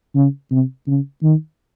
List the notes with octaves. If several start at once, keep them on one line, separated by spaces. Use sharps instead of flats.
C#3
C3
C#3
D#3